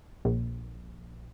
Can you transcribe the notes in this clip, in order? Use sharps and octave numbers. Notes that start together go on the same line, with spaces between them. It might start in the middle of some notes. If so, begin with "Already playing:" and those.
A#1